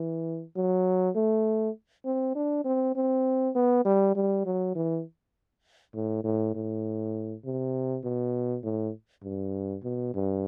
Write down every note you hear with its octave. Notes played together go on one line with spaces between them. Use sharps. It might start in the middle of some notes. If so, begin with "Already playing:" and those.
Already playing: E3
F#3
A3
C4
D4
C4
C4
B3
G3
G3
F#3
E3
A2
A2
A2
C3
B2
A2
G2
B2
G2